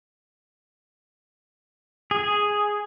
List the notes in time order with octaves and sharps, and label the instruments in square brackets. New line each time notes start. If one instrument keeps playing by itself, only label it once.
[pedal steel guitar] G#4